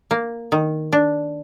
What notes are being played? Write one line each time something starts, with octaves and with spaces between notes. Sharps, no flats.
A#3
D#3
D4